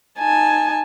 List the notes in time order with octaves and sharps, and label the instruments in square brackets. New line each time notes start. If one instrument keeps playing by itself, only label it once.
[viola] D#4 A5 [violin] G#5